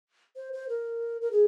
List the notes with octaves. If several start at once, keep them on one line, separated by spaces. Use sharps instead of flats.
C5
C5
A#4
A#4
G#4